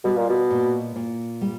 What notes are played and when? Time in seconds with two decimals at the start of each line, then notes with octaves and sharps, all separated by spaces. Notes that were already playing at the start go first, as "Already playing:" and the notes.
0.04 B2 G3
0.17 A#2
0.29 B2
0.51 A#2
0.96 A#2
1.41 G3